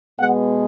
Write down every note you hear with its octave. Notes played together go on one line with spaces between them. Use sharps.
B2 G#3 B3 F#5